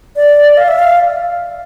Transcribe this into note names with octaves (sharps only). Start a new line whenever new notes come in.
D5
F5
E5
F5